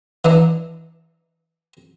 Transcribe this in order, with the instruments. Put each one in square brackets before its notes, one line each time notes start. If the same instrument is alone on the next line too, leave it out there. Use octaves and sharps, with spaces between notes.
[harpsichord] E3 D4 D#4